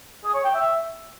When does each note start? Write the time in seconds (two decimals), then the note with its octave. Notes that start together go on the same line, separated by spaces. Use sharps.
0.24 G#4
0.34 C#5
0.44 G5
0.54 E5